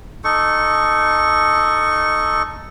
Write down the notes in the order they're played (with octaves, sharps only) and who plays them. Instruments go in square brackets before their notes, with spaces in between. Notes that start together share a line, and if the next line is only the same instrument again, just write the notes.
[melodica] D#4 A4 C#6